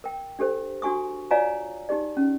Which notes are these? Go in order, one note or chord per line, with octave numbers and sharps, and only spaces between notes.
A#4 G5
D4 G4 A4 C5
D4 F#4 G#5 C#6 D#6
F4 C#5 D5 F5 G#5 A#5
D#4 G4 G#4 D5
C#4